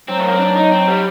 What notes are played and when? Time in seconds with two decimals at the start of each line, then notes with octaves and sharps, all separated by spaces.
0.09 F#3 C4
0.18 A3
0.26 A#3
0.33 C4
0.40 D4
0.56 D#4
0.72 C4
0.88 G3